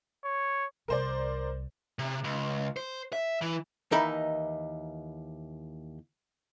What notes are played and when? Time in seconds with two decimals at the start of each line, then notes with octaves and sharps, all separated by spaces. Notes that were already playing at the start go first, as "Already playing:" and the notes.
0.25 C#5
0.88 C2 A#4 C5 D5
1.99 C3
2.24 C#2
2.77 C5
3.13 E5
3.42 E3
3.92 D#2 E3 D#4 A#4 E5 B5